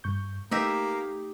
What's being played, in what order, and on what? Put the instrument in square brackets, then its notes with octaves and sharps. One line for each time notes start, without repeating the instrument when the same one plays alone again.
[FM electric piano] G2 C#6 G6
[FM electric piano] A3 [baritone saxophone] A#3 [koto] D#4 G4 E5